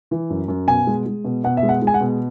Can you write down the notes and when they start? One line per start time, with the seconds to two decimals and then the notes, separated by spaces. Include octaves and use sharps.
0.11 E3
0.30 F#2
0.48 F#2
0.67 B2 G#5
0.87 G#3
1.06 G#3
1.25 B2
1.44 B2 F#5
1.57 E5
1.63 G#3
1.69 F#5
1.82 G#3
1.87 G#5
1.94 F#5
2.00 B2